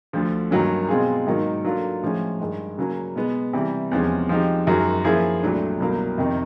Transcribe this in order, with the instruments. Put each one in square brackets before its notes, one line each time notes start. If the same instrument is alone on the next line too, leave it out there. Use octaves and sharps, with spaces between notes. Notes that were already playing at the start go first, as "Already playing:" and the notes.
[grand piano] D2 D3 F3
G2 D#3 F#3 A#3 C#4
B2 G#3 C4 F4 G#4
G#2 D#3 F#3 A#3 D#4
F#3 A#3 D4 F4 A4
A2 F3 G#3 C#4
G2 D#3 G#3
C#3 F#3 A#3 C#4
B2 G#3 B3
C3 E3 G3
E2 C3 F3 G#3 C#4
F3 G#3 C4 D#4 G4
F#2 D#3 G#3 C#4 F#4
F3 A#3 C#4 E4 G#4
C2 A#2 F#3 A3 D4
C2 B2 F#3 A#3
F2 C3 D#3